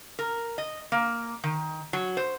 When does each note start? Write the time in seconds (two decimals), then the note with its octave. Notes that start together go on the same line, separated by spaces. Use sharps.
0.19 A#4
0.58 D#5
0.92 A#3
1.44 D#3
1.93 F#3
2.17 C5